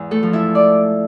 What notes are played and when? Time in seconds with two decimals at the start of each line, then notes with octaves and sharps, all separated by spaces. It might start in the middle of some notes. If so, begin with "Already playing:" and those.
Already playing: E2 G#2 E4
0.11 A3 A4
0.23 F3
0.33 E4 E5
0.55 D5